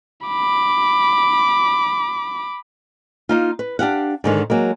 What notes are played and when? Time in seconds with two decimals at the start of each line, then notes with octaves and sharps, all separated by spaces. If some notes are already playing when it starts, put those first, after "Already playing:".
0.27 B5 D6
3.29 A#3 D#4 F4
3.59 B4
3.79 D4 G4 F5 F#5
4.24 G#2 D3 D#3
4.50 F#3 G#3 A#3